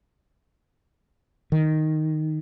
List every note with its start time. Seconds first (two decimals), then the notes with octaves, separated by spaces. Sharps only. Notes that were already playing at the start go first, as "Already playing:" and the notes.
1.52 D#3